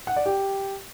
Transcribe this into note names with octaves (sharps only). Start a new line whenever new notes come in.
F#5
D5
G4